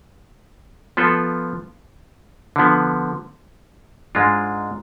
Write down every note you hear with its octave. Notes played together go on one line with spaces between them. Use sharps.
F3 B3 F4 A4
D3 F3 B3
G#2 G#3 D4 F4